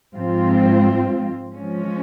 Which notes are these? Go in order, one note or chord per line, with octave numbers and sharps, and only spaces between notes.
G#2 F3 C4 F4
F3 G#3 C#4